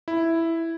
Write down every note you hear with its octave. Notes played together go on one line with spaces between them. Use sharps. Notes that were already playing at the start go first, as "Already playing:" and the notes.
E4